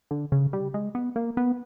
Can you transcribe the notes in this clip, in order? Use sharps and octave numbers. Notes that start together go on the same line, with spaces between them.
D3
C#3
G3
G#3
B3
A#3
B3